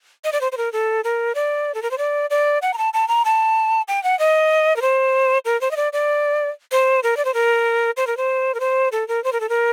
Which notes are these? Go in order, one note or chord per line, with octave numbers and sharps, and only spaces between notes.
D#5
D5
C5
C5
A#4
A4
A#4
D5
A4
A#4
C5
D5
D5
F#5
A#5
A5
A5
A#5
A5
G5
F#5
D#5
A#4
C5
A#4
C5
D#5
D5
D5
C5
A#4
D5
C5
A#4
C5
A#4
C5
A#4
C5
A4
A#4
C5
A#4
A4
A#4